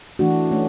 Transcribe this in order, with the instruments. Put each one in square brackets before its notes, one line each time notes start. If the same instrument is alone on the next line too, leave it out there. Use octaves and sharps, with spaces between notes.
[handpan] E3 A3 D4 F#4
A3 C#4